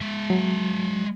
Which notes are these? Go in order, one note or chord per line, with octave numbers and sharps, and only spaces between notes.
G#3 E5
F#3